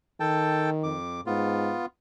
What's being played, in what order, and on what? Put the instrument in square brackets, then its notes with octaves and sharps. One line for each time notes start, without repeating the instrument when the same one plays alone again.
[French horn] D#3 [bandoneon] A4 G5 A5
[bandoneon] F2 D6
[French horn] G#2 [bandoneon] B3 F4